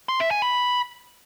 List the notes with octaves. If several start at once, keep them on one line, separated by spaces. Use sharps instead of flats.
C6
E5
G#5
B5